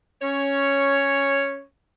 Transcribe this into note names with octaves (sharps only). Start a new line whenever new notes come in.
C#4 C#5